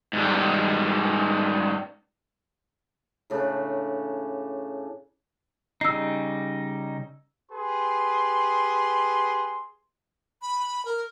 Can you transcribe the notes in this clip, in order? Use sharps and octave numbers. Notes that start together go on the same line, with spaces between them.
G#2 G3
A2 C#3 D4
C#3 G3 D#4 E6 C7
G4 G#4 B4 C6
B5
A#4